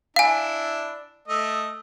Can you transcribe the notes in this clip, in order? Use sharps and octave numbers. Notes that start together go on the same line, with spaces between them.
D4 E4 F5 G#5
A3 D#5